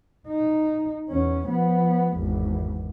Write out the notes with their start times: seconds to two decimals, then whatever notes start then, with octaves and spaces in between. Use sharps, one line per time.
0.28 D#4
1.10 E2 C#4
1.48 F3 B3
2.16 G#1 E2